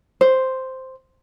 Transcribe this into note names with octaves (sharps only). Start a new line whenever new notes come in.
C5